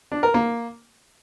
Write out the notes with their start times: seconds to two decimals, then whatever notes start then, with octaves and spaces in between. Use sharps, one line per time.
0.12 D4
0.23 A#4
0.34 A#3